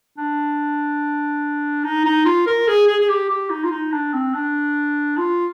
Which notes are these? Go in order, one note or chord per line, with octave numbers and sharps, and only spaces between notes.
D4
D#4
D#4
F4
A#4
G#4
G#4
G#4
G4
G4
D#4
F4
D#4
D4
C4
D4
F4